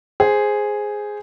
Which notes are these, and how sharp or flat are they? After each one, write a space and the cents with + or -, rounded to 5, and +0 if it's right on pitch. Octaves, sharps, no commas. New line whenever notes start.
G#4 +0 C5 +0